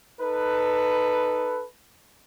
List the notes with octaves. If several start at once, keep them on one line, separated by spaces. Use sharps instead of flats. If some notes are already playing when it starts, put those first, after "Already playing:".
D#4 A4 B4